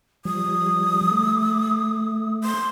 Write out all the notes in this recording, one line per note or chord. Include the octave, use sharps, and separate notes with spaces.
F3 G3 D#6
A3
C6